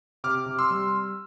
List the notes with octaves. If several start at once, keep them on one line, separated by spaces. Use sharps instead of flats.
C3 D6 F6
C3
C6 E6
G3